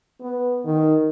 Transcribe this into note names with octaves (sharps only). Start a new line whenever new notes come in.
B3
D#3